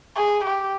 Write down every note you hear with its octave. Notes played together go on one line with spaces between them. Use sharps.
G#4
G4